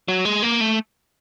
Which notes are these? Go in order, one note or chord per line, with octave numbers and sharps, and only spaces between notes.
F#3
G#3
A#3
A3